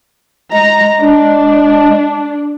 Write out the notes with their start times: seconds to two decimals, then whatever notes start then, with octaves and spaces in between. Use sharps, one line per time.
0.53 G#3 A#5
1.01 D4